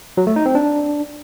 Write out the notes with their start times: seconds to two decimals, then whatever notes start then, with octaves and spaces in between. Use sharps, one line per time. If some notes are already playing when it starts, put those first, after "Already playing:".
0.17 F#3
0.27 A3
0.36 D#4
0.46 C4
0.55 D4